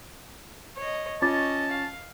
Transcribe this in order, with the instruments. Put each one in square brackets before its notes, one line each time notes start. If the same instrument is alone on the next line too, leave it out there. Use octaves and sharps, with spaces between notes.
[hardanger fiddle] C#5 D#5
[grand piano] C#4 [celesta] F4 D6 A6 [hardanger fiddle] C#5 D#5 [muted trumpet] A5
[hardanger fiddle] F5